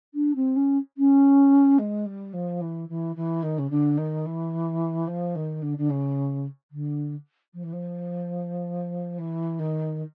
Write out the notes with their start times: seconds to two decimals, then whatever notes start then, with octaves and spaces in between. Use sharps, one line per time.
0.14 D4
0.35 C4
0.56 C#4
0.97 C#4
1.78 G#3
2.06 G3
2.33 F3
2.61 E3
2.89 E3
3.16 E3
3.42 D#3
3.58 C#3
3.70 D3
3.97 D#3
4.25 E3
5.07 F3
5.35 D#3
5.62 D3
5.77 D3
5.89 C#3
6.71 D3
7.53 F3
7.63 E3
7.72 F3
9.18 E3
9.59 D#3